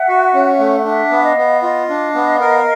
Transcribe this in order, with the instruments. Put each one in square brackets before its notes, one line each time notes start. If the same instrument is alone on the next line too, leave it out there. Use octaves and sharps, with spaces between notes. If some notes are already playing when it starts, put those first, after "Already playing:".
Already playing: [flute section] E5 F#5
[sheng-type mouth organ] F#4
C#4
A3
[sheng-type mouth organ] D4 [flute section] E5 F#5
[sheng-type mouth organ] B3
[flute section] D#5 F5
[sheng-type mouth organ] B3
[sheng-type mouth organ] F4 [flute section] D#5 F5
[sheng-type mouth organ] D4
B3
A#4